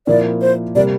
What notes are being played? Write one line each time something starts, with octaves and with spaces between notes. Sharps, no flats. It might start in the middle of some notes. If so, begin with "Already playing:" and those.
A#2 F3 A#3 E4 D5
C5
C3 G3 A#3 D5